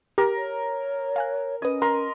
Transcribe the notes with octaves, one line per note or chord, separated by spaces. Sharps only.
G4 A#4
C#5
F5 G#5 F#6
C#4 B4 D#5 G#6
A#4 C6